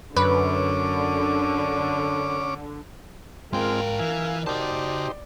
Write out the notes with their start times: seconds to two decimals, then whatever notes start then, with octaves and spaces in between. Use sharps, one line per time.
0.17 F#2 D3 C#4 B4 D6
3.53 G#2 G#3 C4 F4 A#4 F5 G5
3.99 E3 E5 G#5
4.47 D#4 F#4 G4 C5 D5 A5